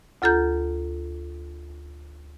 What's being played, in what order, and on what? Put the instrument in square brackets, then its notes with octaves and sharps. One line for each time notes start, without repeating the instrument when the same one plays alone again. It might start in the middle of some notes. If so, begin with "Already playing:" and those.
[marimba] D2 F4 A4 A#5 G6